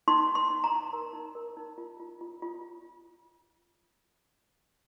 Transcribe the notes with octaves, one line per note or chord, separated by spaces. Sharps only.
D#4 C6
D#4
C6
D#4
A#5
D#4
A#4
D#4
A#4
D#4
F4
F4
F4
F4